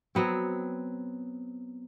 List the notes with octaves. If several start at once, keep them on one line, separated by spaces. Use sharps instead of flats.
F#3 B3 C4